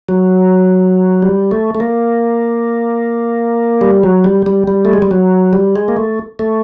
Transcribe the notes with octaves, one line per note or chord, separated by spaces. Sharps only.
F#3
G3
A3
A3
A#3
G3
F#3
G3
G3
G3
A3
G#3
G3
F#3
G3
G#3
A#3
A3
A3